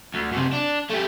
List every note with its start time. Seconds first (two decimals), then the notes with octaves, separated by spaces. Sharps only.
0.14 D2
0.32 F#2 C3
0.53 D4
0.90 A3 G4